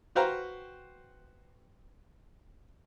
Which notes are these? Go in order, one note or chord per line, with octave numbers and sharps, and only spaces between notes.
F#4 B4 C5 F5 G5 A#5